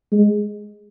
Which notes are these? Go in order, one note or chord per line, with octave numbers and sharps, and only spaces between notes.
G#3